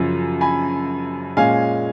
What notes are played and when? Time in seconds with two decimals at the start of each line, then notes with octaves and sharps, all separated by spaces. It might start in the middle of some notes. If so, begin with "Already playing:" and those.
Already playing: F#2 C#3 F3
0.41 G#5 B5
1.37 A#2 G#3 C#4 F5 G#5